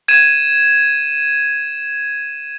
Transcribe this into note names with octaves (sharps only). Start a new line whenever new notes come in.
G#6 D#7 E7